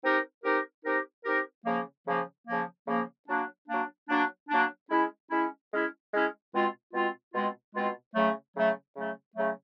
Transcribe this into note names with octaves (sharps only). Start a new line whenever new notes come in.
C4 D#4 G4 A#4
C4 D#4 G4 A#4
C4 D#4 G4 A#4
C4 D#4 G4 A#4
C#3 F3 A#3
C#3 F3 A#3
C#3 F3 A#3
C#3 F3 A#3
F#3 A#3 D4
F#3 A#3 D4
F#3 A#3 D4
F#3 A#3 D4
G#3 C#4 E4
G#3 C#4 E4
G#3 C#4 E4
G#3 C#4 E4
B2 G#3 C4 F4
B2 G#3 C4 F4
B2 G#3 C4 F4
B2 G#3 C4 F4
C#3 F#3 A3
C#3 F#3 A3
C#3 F#3 A3
C#3 F#3 A3